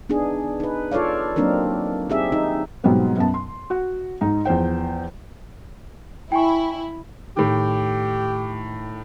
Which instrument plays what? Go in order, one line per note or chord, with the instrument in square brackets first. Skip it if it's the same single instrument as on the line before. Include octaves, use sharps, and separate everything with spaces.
[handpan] B3 D4 D#4 G#4
D#4 B4
F4 A4 C#5 D5 F5
F#3 A#3 C4 D4 D#4 A#4
C4 D#4 G4 G#4 E5
D#4
[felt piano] G#2 B2 F#3 G3 B3 C4
F#2 B3 A5
C6
F#4 F#5
G#2 D#4
E2 F3 C5 G5
[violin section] E4 [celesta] G5 G#5 C#6
[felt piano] A2 D#3 [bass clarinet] G4